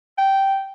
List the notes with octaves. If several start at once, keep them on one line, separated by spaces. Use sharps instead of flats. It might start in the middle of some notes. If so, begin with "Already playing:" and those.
G5